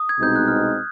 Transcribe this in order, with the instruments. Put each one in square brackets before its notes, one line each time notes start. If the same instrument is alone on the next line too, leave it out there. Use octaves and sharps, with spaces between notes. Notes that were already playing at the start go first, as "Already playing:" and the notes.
Already playing: [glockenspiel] D#6
G#6
[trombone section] C2 B2 G#3 C4 D#4 [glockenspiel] G6
[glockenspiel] F#6
F6